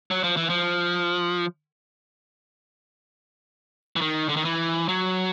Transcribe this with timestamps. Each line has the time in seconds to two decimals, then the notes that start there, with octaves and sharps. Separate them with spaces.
0.11 F#3
0.23 F3
0.37 E3
0.50 F3
3.96 E3
4.01 D#3
4.29 D3
4.36 D#3
4.45 E3
4.89 F#3